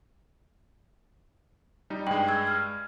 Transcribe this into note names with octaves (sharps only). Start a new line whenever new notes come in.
G3 D#4
G2 G#3 G5 F#7
E6 G#6
F6